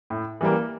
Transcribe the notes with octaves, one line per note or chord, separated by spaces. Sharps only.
A2
E3 G3 A#3